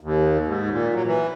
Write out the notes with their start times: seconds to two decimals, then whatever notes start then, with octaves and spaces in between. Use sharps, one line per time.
0.01 D#2
0.48 G#2
0.71 A#2
0.94 F#3
1.07 E3